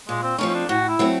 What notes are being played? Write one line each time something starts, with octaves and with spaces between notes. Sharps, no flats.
A#2 G#3
C4
F3 A3 C4 C#4 D#4
C#4
D4
A2 F#4
E4
F#3 A3 C4